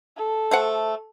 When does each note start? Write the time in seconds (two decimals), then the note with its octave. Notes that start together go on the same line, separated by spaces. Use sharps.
0.17 A4
0.51 A3 C5 F#5